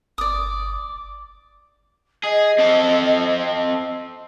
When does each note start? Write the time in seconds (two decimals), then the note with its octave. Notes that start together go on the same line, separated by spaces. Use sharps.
0.18 G1 D5 D6 D#6
2.24 G#4 D#5
2.59 C4 A4